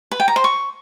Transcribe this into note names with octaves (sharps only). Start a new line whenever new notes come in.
B4
G5
A#5
C5
C#6